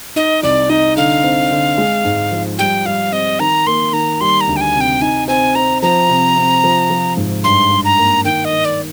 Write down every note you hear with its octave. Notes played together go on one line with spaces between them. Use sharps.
D#4 D#5
C2 D5
D#4 D#5
D3 F5
C4
D3
G#3
G#2
F3
G3 G5
G3 F5
C4 D#5
D#3 A#5
A#3 C6
D#3 A#5
G3 C6
A#5
D2
G5
G#5
C3
G5
D#4 G#5
C4 G#5
C4 A#5
F3 A#5
C3
C3
F3
F3
G#2
G2 C6
G2
A#5
A#3
D#3 G5
D#5
D#3
D5